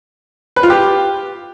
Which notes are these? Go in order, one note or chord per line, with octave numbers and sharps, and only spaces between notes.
B4
F4
G4